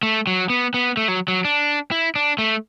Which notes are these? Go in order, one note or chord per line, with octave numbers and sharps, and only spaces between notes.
A3
F#3
B3
B3
A3
F#3
F#3
D4
E4
D4
A3